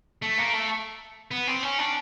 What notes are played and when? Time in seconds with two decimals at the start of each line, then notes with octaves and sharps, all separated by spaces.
0.22 A3
0.38 A#3
0.53 A3
1.31 B3
1.47 C4
1.63 C#4
1.78 D4